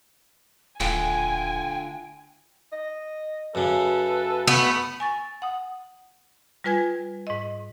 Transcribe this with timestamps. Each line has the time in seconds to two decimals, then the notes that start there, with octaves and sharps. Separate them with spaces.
0.80 D#1 D3 A3 F4 G5 G#5
2.72 D#5
3.55 F#2 C#3 A4 B4
4.47 A3 B3
5.00 G#5 C#6 A6
5.42 F#5 D#6
6.64 G3 F4 B4 G#5 G#6
7.27 G#2 D#5